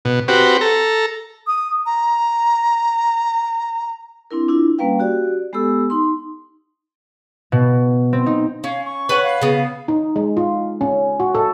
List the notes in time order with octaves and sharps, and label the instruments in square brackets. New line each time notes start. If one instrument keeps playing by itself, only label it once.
[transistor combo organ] B2
C4 F#4 G4 B4
A4 A#5
[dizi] D#6
A#5
[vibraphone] C4 D4 E4 A#4
D4 E4 F4
G3 A#3 C#4 B4 F5 G5
F#4 G4 D5
G#3 B3 G4 A4 E6
D#4 C6
[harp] B2
C4
D#4
[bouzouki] C#4 [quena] F5
[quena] C#6
[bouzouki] B4 C#5 F#5
[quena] F5
[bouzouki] C#3 B3
[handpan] D#4
G#3
F4
C#4
F#4
A4